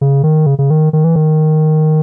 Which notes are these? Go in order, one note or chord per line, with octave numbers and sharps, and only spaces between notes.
C#3
D#3
C#3
C#3
D#3
D#3
E3
D#3